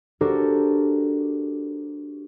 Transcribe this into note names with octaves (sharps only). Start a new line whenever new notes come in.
D4 F#4 G4 A4 A#4 C5